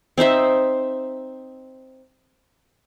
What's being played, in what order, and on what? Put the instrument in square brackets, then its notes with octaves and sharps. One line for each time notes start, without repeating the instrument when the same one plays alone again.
[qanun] C4 D#4 C5 E5